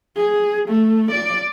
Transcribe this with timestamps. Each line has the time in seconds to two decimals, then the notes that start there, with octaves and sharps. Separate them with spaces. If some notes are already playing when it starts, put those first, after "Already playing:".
0.16 G#4
0.68 A3
1.11 D5